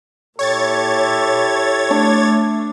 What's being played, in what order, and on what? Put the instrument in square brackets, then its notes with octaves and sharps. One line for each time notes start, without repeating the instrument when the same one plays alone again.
[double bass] A#2 [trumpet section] E4 G4 A4 [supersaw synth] C#5 G#6 A6
[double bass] A3 [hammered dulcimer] D4